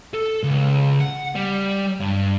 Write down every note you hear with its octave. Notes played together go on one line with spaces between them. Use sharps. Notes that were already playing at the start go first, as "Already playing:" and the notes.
A4
C#2
F#5
G3
G2